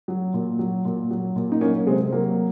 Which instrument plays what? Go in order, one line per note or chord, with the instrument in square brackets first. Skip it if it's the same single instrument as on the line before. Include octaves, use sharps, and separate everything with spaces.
[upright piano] F#3
A#2
F#3
A#2
F#3
A#2
D#4
F#3 A#3 C#4
C3 G#3 C4
F#3 A#3